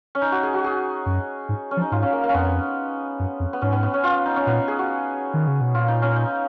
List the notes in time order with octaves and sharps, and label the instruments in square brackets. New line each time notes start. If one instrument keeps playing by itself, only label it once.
[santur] C#4
D#4
F#4
G#4
F#4
G#4
[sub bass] F#2
G#2
[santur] C#4
[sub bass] F3
[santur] D#4
[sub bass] G#2 [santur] F4
[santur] C#4
A#3
A#3
C#4
[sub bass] F2 [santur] B3
[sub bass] F#2
F2
[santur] B3
[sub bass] G#2 [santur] C#4
[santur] B3
B3
C#4
F4
D#4
C#4
[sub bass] A#2 [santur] B3
[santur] G#4
F#4
[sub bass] D#3
C#3
B2
[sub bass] A#2 [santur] F4
[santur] D#4
C#4
D#4